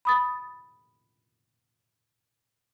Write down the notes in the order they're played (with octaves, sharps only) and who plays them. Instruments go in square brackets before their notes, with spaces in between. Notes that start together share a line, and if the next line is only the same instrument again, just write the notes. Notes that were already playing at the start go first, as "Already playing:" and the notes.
[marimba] B5 D#6 A6